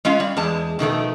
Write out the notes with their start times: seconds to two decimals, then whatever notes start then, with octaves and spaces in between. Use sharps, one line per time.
0.05 G#3 C#4 F4 F5
0.20 G3
0.37 E2 G#3 A5
0.79 B2 D#3 F3 A3